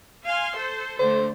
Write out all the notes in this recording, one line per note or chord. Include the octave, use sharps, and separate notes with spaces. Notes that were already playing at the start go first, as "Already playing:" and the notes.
F5 G#5 C6
A4 C5
D3 A3 C5